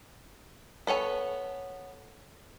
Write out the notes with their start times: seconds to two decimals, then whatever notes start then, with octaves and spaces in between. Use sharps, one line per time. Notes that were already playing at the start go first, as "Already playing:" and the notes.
0.87 B3 A4 C#5 G#5